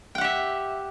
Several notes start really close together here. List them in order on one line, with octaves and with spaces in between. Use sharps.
G5 F#5 G4 E5